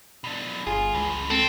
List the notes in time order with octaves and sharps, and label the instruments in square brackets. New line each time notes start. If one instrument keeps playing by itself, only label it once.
[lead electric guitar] B2 D4
[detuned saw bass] G1 [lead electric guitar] F4 [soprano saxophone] G#4
[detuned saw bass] C#2 [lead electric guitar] G2 E3
[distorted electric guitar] C4 [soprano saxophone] A4